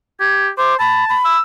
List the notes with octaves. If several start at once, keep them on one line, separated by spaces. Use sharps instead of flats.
G4 G#6
C5 D6
A5 B5
B5
E6